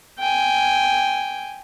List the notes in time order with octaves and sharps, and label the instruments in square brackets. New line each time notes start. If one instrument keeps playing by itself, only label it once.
[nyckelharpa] G5 G#5